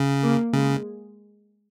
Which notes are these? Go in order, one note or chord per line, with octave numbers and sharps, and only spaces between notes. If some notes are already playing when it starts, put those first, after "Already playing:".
Already playing: C#3
A#3
C#3 G#3